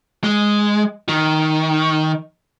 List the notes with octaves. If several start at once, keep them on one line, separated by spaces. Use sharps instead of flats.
G#3
D#3